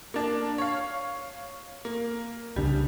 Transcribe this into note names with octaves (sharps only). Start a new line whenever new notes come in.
A#3 D4
C#5 F5
A#3
C2 C#3 G3 D4